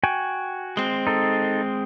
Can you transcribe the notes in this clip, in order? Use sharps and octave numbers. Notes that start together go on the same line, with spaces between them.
F#4 G5 G#5
G#3 C4
D#4 A4